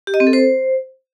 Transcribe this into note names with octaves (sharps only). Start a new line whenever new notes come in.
G4
D#5
C4
A4
C5